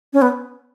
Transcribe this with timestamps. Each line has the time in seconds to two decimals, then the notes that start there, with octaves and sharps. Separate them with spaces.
0.13 C#4
0.22 B3